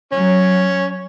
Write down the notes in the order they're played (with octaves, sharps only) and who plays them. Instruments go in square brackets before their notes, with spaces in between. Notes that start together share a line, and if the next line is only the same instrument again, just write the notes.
[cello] F#3 [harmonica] C#4